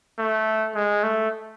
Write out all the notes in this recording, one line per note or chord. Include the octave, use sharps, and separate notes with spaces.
A3
G#3
A3